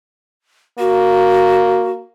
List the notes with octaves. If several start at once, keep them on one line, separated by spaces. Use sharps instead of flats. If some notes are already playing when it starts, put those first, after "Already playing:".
A#3 F#4